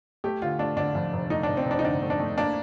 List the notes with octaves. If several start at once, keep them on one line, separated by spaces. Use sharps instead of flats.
A3 G4
D3 F4
A3 D4
D3 D4
F2
F1
A3 D#4
D4
F1
C4
F1 D4
D#4
D3 D4
A3
D4
A3
A#3 D4